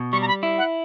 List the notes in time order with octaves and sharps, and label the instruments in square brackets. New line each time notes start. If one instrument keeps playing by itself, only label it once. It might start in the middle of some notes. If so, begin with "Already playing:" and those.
Already playing: [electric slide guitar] B2
[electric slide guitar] G3 [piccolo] C#6
[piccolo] A#5
B5
[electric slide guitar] E4
[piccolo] F#5